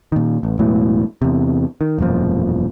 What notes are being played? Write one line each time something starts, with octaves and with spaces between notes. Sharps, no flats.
A#2 D#3
A1
E1 A2 E3 F#3
E2 C3
D#3
E1 F#2 A#2 F3